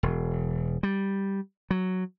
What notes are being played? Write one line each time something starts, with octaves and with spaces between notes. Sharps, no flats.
E1
G3
F#3